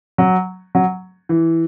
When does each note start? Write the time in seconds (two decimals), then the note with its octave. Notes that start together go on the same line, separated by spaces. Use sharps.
0.18 F#3
0.75 F#3
1.29 E3